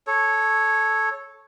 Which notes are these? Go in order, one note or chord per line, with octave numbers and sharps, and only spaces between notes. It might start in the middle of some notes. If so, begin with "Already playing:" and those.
A4 C#5